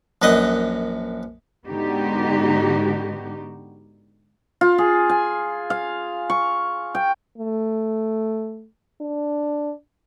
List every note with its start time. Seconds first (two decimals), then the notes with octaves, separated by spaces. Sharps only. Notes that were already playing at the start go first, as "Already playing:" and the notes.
0.22 A#1 F#2 B4 D#5 D#6
1.66 G#2 D3 B3 D#4 F#4 G4
4.61 F4
4.78 G#4
5.10 G#5
5.70 F5
6.30 C#6
6.95 G5
7.38 A3
9.01 D4